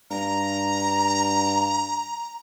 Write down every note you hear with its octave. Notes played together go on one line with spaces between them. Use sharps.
G2 A#5